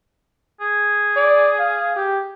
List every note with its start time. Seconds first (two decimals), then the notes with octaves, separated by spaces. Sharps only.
0.60 G#4
1.16 D5
1.59 F5
1.96 G4